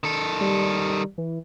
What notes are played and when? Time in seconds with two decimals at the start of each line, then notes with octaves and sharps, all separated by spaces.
0.04 D#3 A4
0.41 G3
1.18 E3